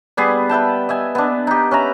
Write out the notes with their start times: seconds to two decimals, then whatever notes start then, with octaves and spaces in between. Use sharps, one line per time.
0.17 G3 B3 G#4
0.49 B4 E5 G5 A5
0.89 D#5 E5 G#5
1.15 B3 D4
1.47 D#4 G4
1.71 C#4 B4 E5 A#5